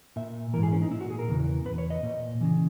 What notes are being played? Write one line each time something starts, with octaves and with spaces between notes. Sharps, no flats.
A#2 E5
G#2 E3 A#4
G#4
C#4
D#4
A#2 E4
F#4
G#4
A#4
E2 C#3 E3
B2 B4
E2
C#5
D#5
A#2
C#3 E3